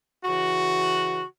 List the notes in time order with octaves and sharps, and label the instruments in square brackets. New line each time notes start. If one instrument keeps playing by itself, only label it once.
[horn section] C#3 E3 F#4